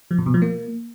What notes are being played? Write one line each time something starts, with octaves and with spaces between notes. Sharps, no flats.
F3
A#2
B2
F3
A#3